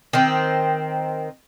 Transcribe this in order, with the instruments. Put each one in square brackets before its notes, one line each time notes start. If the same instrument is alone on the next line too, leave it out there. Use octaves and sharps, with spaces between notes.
[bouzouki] D#3 C4